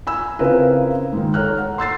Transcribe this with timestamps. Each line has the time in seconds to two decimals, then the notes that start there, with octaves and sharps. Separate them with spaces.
0.07 G#5 B5 E6
0.39 C#3 C4 E4 F4 A#4 B4
1.13 G#2 D#3
1.34 A4 C#5 A#5 F6 F#6
1.58 F#5
1.78 C6 E6 A6 C7